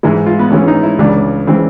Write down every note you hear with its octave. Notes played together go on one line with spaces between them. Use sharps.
G#2 E3 G#3 E4
F4
B3
G#2 E3 G#3 C#4
D#4
E4
C#2 C#3 E3 G#3 D4
C#3 E3 G#3 C4